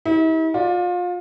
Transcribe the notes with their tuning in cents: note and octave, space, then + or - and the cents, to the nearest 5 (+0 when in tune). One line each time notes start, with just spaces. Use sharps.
E4 -45 G4 +0
F4 +30 D5 +0